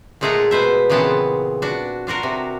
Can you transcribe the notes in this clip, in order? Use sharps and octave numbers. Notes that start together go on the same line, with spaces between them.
A#2 G#3 A3 G#4 F#5 A#5
B2 B4 C5 E5
A#2 C#3 E3 B3 C4 A5
D4 F#4
D4 F4 F#4 A#4
C3